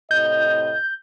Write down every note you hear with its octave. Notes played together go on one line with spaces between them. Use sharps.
A2 C3 D#5 G6